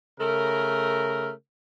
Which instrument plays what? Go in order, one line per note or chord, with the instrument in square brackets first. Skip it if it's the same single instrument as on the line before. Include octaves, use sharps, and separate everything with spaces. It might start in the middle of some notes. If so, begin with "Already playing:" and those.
[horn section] C#3 A3 A#4